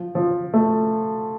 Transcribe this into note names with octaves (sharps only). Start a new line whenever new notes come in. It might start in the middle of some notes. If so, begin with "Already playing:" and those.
Already playing: F3
F3
A3